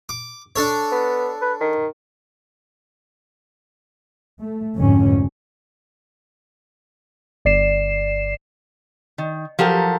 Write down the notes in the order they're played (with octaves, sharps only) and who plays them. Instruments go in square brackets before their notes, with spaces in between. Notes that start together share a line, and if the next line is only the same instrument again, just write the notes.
[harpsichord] D6
D4 A4 C#5
[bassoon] B3
B4
D#3
[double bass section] A3
F1 F2 G#2 D3 C#4
[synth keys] G1 D5 C7 E7
[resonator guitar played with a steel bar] D#3
F3 F#3 G4 A4 A#4